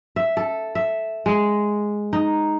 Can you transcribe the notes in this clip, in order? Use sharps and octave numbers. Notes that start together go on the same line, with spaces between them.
E5
A4
E5
G#3
D#4